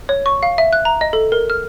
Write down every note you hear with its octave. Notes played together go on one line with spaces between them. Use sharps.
C#5
C#6
F5
E5
F#6
A#5
D#5
A4
A#4
F6